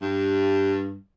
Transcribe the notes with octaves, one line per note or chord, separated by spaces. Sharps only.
G2